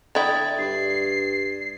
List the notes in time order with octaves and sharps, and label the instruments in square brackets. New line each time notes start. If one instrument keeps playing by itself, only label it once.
[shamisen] D3 E4 G5 [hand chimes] D#6 G#6 A6
[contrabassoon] G2 [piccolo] C7